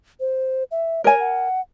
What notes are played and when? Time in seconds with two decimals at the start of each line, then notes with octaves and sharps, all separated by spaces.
0.20 C5
0.71 E5
1.04 A#4 C#5 G#5
1.20 F#5